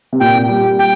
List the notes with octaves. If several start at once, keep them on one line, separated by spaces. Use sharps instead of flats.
C3
A#2 G5
G3
G5